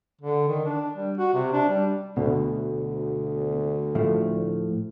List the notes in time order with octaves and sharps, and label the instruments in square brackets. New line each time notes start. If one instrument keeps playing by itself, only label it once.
[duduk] D3
D#3
D4
G3
F#4
C3
D4
G3
[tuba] D2 [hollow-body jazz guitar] B2
[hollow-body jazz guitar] A2 F3 A3